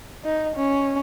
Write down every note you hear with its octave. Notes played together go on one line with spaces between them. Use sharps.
D#4
C#4